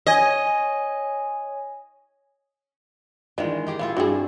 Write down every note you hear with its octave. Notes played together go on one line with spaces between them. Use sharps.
C#5 D#5 G#5
D#3 E3 G#3 D4 F4
D#4 G4 G#4
B3 E4 F4 F5
G2 C4 F#4 G#4 A4